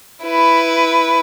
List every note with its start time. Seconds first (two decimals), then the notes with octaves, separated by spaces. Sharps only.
0.24 E4 B4